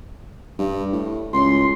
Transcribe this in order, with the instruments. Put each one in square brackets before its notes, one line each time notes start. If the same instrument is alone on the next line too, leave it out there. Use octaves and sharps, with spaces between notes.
[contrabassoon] G2
A2
[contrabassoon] C#2 [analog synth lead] C6